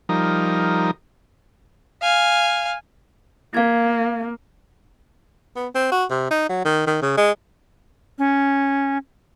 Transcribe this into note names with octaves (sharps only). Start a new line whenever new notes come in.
F3 G3 D#4 A#4
F5 G#5
A#3 F5 G#6
B3
C4
F#4
C3
D#4
F#3
D#3
D#3
C#3
G#3
C#4